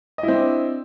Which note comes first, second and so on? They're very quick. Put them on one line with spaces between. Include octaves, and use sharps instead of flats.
D#5 E4 C4 D4